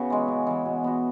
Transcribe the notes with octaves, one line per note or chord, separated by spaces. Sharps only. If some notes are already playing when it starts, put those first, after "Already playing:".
Already playing: C#3 B3 F#4 B4
E3 G#3
C#3
E3 G#3
B2
B3 F#4